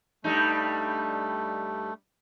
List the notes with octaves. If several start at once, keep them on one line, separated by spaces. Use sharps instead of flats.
G2 G3 A3 D#4